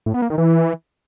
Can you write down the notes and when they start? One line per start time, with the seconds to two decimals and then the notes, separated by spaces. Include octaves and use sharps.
0.06 A2
0.14 B3
0.22 A#3
0.30 D#3
0.38 E3